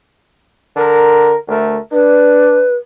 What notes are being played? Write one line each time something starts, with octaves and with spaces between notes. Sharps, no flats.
D3 A#4
D2 A3 A#4
D4 B4